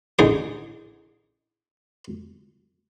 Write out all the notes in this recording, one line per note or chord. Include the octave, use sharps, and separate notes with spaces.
A1 D3 D#4 G#4 D6